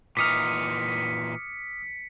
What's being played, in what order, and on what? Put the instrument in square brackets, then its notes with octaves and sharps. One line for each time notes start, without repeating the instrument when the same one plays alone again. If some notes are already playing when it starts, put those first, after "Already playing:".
[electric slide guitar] A#2 E3 D#4 [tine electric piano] D6 D#6 F6 [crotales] B6 C#7